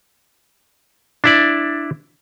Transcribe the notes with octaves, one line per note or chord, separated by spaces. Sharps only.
D4 E4 D5